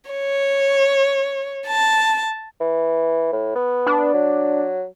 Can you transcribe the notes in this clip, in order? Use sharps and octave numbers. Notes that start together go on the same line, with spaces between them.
C#5
A5
E3
A2
B3
D4
F#3